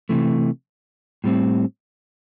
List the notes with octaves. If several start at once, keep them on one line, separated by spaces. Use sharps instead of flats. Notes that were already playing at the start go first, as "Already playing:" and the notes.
C3 E3 A3
A2 G3 C4